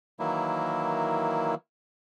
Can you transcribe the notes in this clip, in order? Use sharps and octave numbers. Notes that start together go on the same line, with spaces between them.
D#3 E3 F#3 A#3 E4